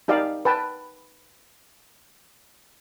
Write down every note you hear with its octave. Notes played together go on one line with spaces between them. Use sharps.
D#4 G4 D5 F5
B4 G5 A5